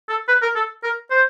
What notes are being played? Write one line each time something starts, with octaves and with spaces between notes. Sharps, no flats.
A4
B4
A#4
A4
A#4
C5